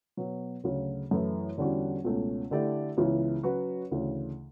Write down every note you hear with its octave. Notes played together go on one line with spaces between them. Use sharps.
B2 F#3 B3
D2 C#3 F#3
F#2 E3 A3 E4 B4
E2 D3 G3 C#4 F#4
C#2 B2 A3 C#4
D3 A3 E4 G4 D5
C#2 C#3 E3 B3 E4
F#3 C#4 F#4 B4
D2 C#3 E3